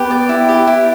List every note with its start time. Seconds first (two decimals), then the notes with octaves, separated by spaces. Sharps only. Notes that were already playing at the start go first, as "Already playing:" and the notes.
Already playing: B3 G4 B4
0.11 D5
0.29 E4
0.49 G4
0.67 E4